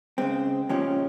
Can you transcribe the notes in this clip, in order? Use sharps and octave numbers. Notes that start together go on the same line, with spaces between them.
C#3 G#3 C4
A#2 F3 G#3 C#4 G4